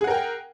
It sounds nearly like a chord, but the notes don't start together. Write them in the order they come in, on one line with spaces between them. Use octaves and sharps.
G#4 F#5 A#4 G5